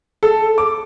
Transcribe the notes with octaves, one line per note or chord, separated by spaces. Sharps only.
A4
D6